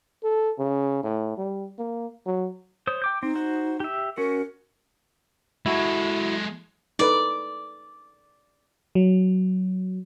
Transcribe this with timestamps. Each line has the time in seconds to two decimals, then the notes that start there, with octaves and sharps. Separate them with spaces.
0.23 A4
0.59 C#3
1.03 A2
1.38 G3
1.79 A#3
2.26 F#3
2.87 C5 C#5 D#6
3.02 G5 D6 G6
3.23 C4 D#4
3.35 F#4 C5
3.80 G4 E5
4.17 C#4 F#4 A#4
5.66 G#3 E4 F#4 A4
6.99 D#4 A4 B4 D5
8.95 F#3